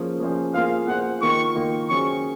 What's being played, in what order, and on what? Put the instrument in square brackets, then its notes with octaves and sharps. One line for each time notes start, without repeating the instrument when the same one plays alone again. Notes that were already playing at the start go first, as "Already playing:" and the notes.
Already playing: [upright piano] F3 A#3 C#4 G#4 C5
F3 A#3 C#4 G#4 C5
[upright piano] A#3 F4 G#4 C5 [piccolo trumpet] F5
[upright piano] A#3 F4 G#4 C5 [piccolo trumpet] F#5
[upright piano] D#3 A#3 F4 [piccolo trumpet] C#6
[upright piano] D#3 A#3 F4
[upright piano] F#3 C#4 G#4 C5 [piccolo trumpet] C#6